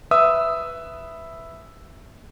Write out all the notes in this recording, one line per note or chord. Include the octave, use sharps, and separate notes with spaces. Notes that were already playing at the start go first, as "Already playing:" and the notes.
B4 E5 D#6 E6